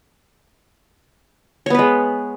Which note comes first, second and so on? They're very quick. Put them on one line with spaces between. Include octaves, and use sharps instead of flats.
C#5 B3 B4 G#3